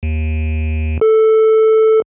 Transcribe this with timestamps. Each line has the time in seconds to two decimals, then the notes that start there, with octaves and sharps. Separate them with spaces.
0.03 D#2
1.01 A4